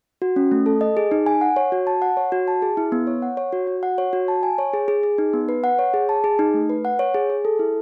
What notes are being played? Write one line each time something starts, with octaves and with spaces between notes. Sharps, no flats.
F#4
C#4
A3
A4
D#5
G#4
D#4
G#5
F#5
C#5
F#4
A5
F#5
C#5
F#4
A5
G#4
E4
B3
C#5
F#5
C#5
F#4
F#4
F#5
C#5
F#4
A5
G#5
C#5
G#4
G#4
G#4
D#4
B3
B4
F#5
C#5
G#4
A5
G#4
D#4
A3
B4
F#5
C#5
G#4
G#4
A4
E4